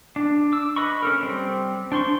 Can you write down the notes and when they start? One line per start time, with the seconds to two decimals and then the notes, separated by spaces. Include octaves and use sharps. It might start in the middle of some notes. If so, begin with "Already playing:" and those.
0.16 D4
0.52 D6 E6
0.76 B4 D#5 B5 C#6
1.03 C#4 A4 A#4
1.23 G3 C4
1.92 D4 C5 C6 C#6